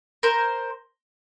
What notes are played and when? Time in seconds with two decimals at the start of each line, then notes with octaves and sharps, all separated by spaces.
0.23 A#4 C5